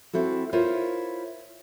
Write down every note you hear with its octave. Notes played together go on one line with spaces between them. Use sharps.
C4 E4 F#4 A4
E4 F4 A#4 C5 C#5